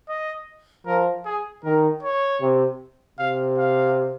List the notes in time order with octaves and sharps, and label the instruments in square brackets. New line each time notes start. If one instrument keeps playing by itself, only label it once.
[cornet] D#5
[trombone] F3 [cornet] A#4
[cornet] G#4
[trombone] D#3 [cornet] A#4
[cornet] C#5
[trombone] C3
[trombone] C3 [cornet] F5
[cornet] F5